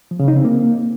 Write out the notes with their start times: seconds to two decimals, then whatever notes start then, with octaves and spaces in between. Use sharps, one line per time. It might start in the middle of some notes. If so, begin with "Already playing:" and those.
0.11 F3
0.20 C#3
0.28 D#4
0.36 C4
0.45 A#3